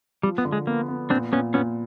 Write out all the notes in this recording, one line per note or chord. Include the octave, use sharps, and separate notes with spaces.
F3 G3
B3
D3
G#3
A#3 B3
B3
A#2 C4 D4
A#2 B3 C#4
A#2 B3 C#4